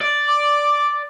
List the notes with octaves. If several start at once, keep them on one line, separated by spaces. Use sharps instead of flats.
D5
D6